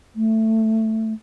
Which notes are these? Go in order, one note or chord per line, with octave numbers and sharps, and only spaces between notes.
A3